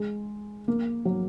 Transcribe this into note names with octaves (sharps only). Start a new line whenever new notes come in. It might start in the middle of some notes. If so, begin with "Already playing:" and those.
Already playing: G#3
A#3
F#3